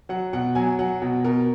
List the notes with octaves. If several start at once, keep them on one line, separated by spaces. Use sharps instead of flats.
F#3 F#5
B2 F#5
F#3 G#5
F#3 F#5
B2
B2 A#4